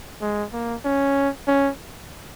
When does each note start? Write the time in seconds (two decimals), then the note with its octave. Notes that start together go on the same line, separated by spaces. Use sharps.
0.21 G#3
0.53 A#3
0.85 C#4
1.48 C#4